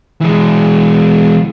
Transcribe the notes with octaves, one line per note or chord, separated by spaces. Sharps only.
E3 G#3